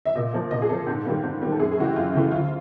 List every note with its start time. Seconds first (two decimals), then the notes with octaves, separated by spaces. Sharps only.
0.05 E5
0.15 A#2 D#5
0.33 F3 A#3
0.51 A#2 D#5
0.62 G#4
0.69 F3 A#3 A4
0.87 G#2
1.05 D#3 G3 A#3
1.23 G#2
1.41 D#3 G3 A#3
1.52 A4
1.60 F#2 G#4
1.71 G#4
1.77 C#3 E3 A3 F#4
1.84 G4
1.96 F#2 F4
2.14 C#3 E3 A3
2.31 D2 F4